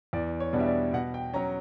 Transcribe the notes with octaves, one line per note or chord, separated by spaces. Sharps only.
E2 D5
C#5
B2 G3 B3 D4
E5
D5
B2 F#5
G5
F#3 C#4 A#5